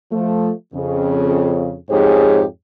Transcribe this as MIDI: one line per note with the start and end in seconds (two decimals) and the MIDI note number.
0.12 0.50 53
0.12 0.50 57
0.75 1.75 41
0.75 1.75 49
1.90 2.44 41
1.90 2.44 44
1.90 2.44 67
1.90 2.44 68
1.90 2.44 73